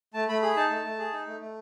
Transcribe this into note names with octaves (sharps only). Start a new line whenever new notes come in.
A3 A5
A3 B5
G#4 B5
D#4 A5
A3
A3
G#4
D#4
A3
A3